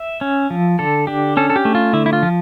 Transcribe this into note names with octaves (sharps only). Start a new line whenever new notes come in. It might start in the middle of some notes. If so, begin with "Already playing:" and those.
Already playing: E5
C#4
F3
D3 A4
D4 G4
C#4 A4
A4
G4
A3
F4
D3 E4
E4
F4
F3